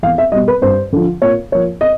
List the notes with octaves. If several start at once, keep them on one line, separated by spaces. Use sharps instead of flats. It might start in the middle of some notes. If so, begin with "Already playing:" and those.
E2 F5
E5
B2 G3 D#5
B4
G2 C5
D3 F3
A#2 C#5
F3 A#3 C#5
D#5